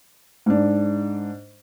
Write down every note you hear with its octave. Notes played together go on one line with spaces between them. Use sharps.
G#2 D4